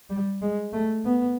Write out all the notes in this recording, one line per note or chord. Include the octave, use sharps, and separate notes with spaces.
G3
G#3
A3
B3